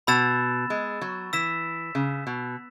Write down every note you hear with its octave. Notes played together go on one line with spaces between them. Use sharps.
B2 B5 E6 A6 E7
G#3
F#3
E3 E6 B6 E7
C#3
B2